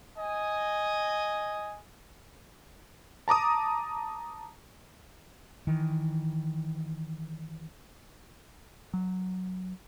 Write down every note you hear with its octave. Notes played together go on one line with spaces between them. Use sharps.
D#5 G#5
A5 A#5 D6 D#6
D#3 E3
F#3